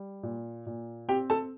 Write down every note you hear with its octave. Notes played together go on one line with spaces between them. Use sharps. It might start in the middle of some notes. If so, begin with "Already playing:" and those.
Already playing: G3
A#2
A#2
C4 G4 G5
A4 A5